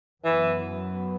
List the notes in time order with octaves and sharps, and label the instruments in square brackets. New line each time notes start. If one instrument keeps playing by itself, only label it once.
[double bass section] F#2 F#3 B3 [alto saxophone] E3